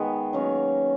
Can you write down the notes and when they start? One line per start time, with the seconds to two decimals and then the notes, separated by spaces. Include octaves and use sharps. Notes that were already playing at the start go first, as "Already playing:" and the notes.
Already playing: D#3 G#3 B3
0.33 D#3 F#3 A#3 C#4